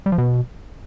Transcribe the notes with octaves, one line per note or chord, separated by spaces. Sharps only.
G3
F3
B2